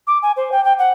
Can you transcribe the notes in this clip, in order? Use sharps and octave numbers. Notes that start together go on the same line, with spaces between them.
D6
G#5
C5
G5
G5
F#5